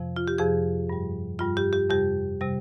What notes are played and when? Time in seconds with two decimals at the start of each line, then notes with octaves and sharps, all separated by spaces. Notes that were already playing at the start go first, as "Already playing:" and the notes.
Already playing: F2 C3 F3
0.16 F4
0.28 G4
0.38 F2 C3 F3 G#4
0.89 G2 G3
1.39 G2 G3 F4
1.57 G4
1.73 G4
1.90 F2 C3 G3 G4
2.41 C3 G3